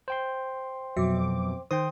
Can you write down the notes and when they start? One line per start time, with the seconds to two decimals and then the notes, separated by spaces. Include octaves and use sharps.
0.08 C5 G5 C6
0.97 F2 B2 F#3 E5 D6
1.71 D#3 C5 G5 C6 D#6